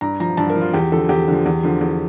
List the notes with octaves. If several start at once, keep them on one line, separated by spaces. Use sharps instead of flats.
G2 A#5
F3 A#5
G2 A5
A#4
F3
F4
E2 G4
D3 F3 A4
E2 G4
D3 F3
E2
D3 F3
E2